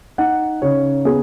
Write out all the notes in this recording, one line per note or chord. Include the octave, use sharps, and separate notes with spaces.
D#4 F#5
C#3 C#5
B3 G#4